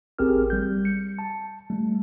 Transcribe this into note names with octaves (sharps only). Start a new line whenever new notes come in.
A1 C4 G4 G#4 A#4 F6
G3 G6
C#7
A5
G3 A3